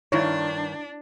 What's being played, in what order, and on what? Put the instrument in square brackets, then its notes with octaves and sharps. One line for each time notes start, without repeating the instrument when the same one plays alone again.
[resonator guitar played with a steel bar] G2 D#3 [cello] D4 [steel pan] E4 C#5